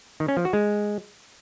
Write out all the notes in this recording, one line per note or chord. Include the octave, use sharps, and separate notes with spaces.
D#3
C#4
F3
F#4
G#3